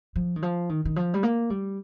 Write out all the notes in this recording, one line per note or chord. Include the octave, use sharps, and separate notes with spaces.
F3
D#3
F3
D#3
D#3
F3
G3
A#3
G3